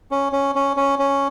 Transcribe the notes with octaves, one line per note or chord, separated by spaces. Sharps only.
C#4
C#4
C#4
C#4
C#4